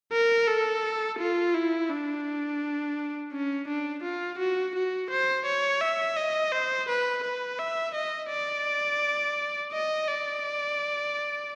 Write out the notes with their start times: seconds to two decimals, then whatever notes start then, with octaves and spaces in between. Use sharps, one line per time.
0.13 A#4
0.48 A4
1.19 F4
1.54 E4
1.90 D4
3.32 C#4
3.68 D4
4.03 F4
4.39 F#4
4.75 F#4
5.10 C5
5.46 C#5
5.81 E5
6.17 D#5
6.52 C5
6.88 B4
7.24 B4
7.59 E5
7.95 D#5
8.30 D5
9.73 D#5
10.08 D5